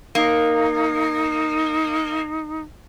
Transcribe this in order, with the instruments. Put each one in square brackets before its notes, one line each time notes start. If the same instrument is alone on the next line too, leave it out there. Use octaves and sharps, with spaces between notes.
[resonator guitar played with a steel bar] A#3 [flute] D#4